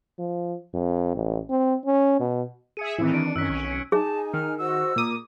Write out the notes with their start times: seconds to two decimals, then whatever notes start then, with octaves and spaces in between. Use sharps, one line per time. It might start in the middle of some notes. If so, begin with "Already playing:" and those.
0.19 F3
0.74 F2
1.15 A1
1.50 C4
1.86 C#4
2.20 B2
2.77 G#4 E5 C#7 D#7
2.98 A2 D#3 E3 C4 E4
3.14 D4 D7
3.36 F#2 D#3 C#4 E6 F#6 B6
3.50 B1 C#4
3.70 G#6 C#7
3.92 D#4 G#4 G#5 A5
4.34 D#3 F6
4.58 F#4 C5 D#5 E6
4.96 A#2 A#4 D6 D#6